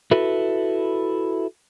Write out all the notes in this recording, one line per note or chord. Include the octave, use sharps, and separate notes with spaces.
E4 F#4 A4 B4